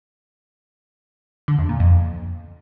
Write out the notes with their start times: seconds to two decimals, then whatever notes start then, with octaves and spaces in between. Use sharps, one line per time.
1.48 D3
1.59 E2
1.69 A#2
1.80 F2